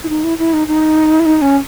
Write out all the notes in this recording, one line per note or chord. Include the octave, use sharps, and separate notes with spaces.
E4
D#4
E4
E4
D#4
D#4
E4
D#4
C#4